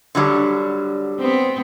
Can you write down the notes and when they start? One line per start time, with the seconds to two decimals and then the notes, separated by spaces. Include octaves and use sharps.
0.15 D3 F#3 G3
1.20 B3 C4